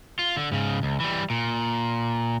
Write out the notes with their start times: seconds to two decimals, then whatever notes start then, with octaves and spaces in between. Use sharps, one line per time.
0.19 F4
0.37 D3
0.52 G#2 C#3
0.83 C#2
1.00 E3 G3
1.30 A#2